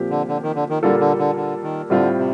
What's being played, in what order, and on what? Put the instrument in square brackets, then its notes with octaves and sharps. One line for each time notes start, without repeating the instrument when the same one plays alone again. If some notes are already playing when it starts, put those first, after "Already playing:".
Already playing: [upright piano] A#2 F3 C4 G4
[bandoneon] D3
D3
D#3
D3
D#3
[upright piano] A#2 G3 A#3 F4 A4 [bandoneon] D3
[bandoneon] D3
D3
D3
D#3
[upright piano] A2 G3 C4 F4 [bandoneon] D3
[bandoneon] C3